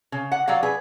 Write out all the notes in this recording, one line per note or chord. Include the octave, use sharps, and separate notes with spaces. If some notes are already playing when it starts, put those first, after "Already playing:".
C#3
F#5
F#3 G3 F#4 F5
G#4 B4